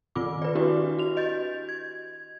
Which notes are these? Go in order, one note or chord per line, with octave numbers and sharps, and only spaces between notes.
D#3 C4 F4 D6
B4 D5
D4 E4 F#4 G4 B4
F#4 F7
D#5 G6 A6
G#6